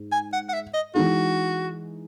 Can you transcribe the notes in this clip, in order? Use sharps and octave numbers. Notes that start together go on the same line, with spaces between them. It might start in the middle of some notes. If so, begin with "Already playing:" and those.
Already playing: G#2
G#5
F#5
F#5
E5
D#5
E3 G#3 D#4 F#4 G#4